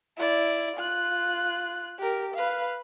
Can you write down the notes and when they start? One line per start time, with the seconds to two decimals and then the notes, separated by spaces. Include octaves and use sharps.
0.17 E4 D5
0.76 F4 F#6
1.98 G4 A#4
2.34 B4 F5